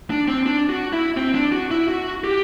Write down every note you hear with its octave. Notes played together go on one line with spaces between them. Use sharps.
D4
C4
D4
F#4
E4
C4
D4
F#4
E4
F#4
G4